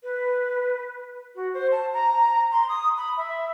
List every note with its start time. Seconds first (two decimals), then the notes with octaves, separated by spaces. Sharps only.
0.03 B4
1.35 F#4
1.53 C5
1.71 A5
1.93 A#5
2.51 C6
2.68 D#6
2.97 B5
3.17 E5